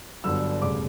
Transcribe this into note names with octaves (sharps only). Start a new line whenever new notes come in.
G1 G2 D3 F#3 E6
E1 D2 C#3 G3 D6